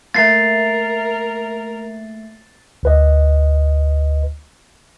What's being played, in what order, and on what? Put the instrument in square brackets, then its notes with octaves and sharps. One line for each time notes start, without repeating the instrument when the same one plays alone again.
[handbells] A3 A#3 [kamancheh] A#4 [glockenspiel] A6 C7
[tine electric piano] D2 B4 D#5